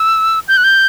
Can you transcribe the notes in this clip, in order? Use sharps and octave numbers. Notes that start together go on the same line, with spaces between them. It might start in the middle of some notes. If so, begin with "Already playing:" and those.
Already playing: E6
G6
F#6
G6